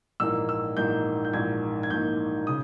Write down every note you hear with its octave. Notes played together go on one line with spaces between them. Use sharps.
A#1 G#2 E3 A#3 D#4 E6
E6
A#1 G#2 E3 A#3 D#4 G6
G6
A#1 G#2 E3 A#3 D#4 G#6
G#6
A#1 G#2 E3 A#3 D#4 G6
C#3 D#6